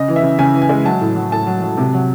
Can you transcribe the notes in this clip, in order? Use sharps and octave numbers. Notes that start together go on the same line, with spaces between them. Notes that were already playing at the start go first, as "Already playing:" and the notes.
Already playing: C#3 D#5
E3
E5
C#3
C#3 G#5
E3
G#5
G#3
F#3 A5
A2
F#3
A2 A5
F#3
F#3
C3
F#3